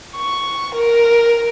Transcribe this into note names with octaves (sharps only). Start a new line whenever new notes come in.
C#6
A#4